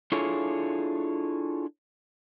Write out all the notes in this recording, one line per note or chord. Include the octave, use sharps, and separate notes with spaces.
D4 E4 F4 G#4 A4 C#5